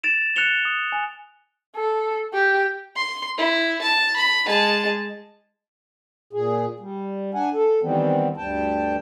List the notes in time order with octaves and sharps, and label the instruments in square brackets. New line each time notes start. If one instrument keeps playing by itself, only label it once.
[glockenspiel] A6 D7 E7 F7
F#6 A6 C#7 F7 G7
D#6
G#5
[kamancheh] A4
G4
[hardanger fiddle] C6
E4
A5
B5
G#3 A5
[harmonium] A#2 G#4
G3
D4 F#5 G#5
A4
D#3 E3 G3 B3 C4
D2 G2 G3 G5 A5